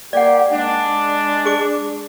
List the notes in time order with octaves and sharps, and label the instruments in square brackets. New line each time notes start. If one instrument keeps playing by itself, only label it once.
[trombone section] A#3 G4 [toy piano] D5 F#5
[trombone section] G#3 D4
[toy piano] G#4 D6